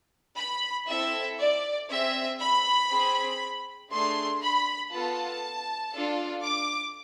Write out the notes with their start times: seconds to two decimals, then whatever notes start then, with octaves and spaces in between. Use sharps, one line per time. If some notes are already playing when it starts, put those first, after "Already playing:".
0.37 B5
0.88 C4 E4 A4 E5
1.39 D5
1.89 C4 G#4 E5
2.39 B5
2.90 C4 G#4
3.91 A3 D4 G#4 C6
4.41 B5
4.92 B3 F4 A4 A5
5.92 D4 F4 A4
6.43 D6